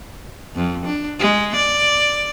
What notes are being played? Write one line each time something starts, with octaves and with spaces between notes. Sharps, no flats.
F2
D4
G#3
D5